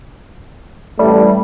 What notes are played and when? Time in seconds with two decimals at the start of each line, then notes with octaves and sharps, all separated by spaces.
0.99 A1 A2 G3 A3